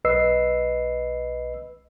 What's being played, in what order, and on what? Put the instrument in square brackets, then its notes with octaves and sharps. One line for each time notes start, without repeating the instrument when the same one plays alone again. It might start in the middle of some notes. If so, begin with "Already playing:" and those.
[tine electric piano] B1 B4 D#5 E6 C7